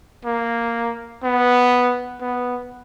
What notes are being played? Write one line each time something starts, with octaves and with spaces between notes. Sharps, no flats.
A#3
B3
B3